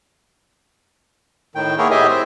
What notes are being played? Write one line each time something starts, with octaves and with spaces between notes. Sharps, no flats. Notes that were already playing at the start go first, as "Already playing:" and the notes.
A2 D#3 G5
A#3 B3 E4 G#4 A#4 C#5
A2 G4 G#4 D#5 E5 G#5
C4 E5